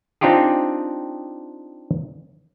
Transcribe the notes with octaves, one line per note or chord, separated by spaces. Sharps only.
C4 D4 D#4 F4 G4 G#4